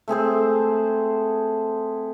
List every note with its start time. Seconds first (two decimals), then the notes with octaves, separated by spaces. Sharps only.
0.08 A3 C4 G#4 C5